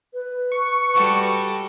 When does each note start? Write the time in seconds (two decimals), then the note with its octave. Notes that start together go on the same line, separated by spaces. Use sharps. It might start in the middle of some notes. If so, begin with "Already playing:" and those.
0.14 B4
0.52 C#6
0.94 G3 F#4 A4